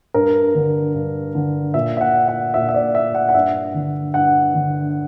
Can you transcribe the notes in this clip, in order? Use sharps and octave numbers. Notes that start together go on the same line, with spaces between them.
G2 A#4
D3
G2
D3
A#2 E5
E5
F#5
F#5
A#2 E5
E5
D5
E5
F#5
F#5
G2 E5
D3
G2 F#5
D3